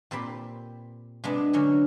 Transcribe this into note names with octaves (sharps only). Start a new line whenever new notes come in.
A#2 C4 G4 B5
C3 G#3 B3 D4
D3 F#3 C#4